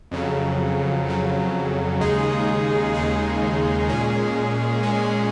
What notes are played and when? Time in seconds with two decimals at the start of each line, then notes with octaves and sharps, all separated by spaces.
0.11 F2 C#3 F#3
1.06 F2 C#3 F#3
2.01 D#2 C#3 G#3 D#4 G#4
2.94 D#2 C#3 G#3 D#4 G#4
3.89 A#2 G#3 C#4 G#4
4.83 A#2 G#3 C#4 G#4